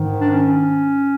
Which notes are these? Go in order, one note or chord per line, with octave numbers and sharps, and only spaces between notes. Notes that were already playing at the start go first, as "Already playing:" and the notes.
Already playing: G#2 D#3
D4
C#4